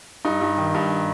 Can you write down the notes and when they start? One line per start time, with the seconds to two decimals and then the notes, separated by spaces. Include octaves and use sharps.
0.25 G2 D#4
0.41 G2
0.58 D#3
0.74 G2